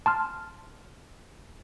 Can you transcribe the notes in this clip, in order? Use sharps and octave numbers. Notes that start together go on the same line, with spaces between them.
A5 C6 F6